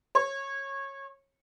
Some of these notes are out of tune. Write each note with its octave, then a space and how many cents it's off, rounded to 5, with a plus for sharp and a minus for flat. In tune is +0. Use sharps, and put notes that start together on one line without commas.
C#5 -20